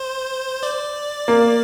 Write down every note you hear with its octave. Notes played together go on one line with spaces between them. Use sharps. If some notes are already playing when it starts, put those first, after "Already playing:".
Already playing: C5
D5
A#3